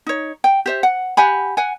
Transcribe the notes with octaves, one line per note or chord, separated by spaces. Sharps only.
D#4 C#5
G5
G4 C5 E5
F#5
G4 F#5 G#5 B5
F#5 G#5